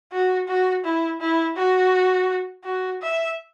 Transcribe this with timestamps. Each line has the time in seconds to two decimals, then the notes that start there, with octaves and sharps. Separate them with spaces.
0.12 F#4
0.47 F#4
0.84 E4
1.21 E4
1.56 F#4
2.64 F#4
3.02 E5